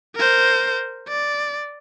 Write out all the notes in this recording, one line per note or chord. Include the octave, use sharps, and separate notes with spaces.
A#4 C5
D5